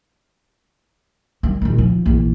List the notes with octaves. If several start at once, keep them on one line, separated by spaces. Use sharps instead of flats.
D#3 G3
A#2 D#3
F3
A#1 E3